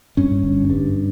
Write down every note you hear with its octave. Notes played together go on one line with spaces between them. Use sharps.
G2 C#4
G1
G2